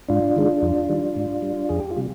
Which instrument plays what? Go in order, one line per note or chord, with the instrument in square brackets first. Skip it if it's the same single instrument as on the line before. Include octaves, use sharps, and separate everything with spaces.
[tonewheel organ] G#2 D4 F4
D#3 G#3
F2
D#3 G3
G#2
G3
F2 G#4
G4
F4
C3 G3